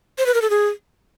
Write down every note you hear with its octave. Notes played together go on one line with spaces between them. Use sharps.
C5
B4
A#4
A4
G#4